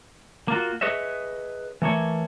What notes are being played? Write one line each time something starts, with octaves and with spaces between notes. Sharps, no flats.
A#3 F4 F#4
G#4 B4 C#5 D#5 E5
E3 A3 A#3 C#5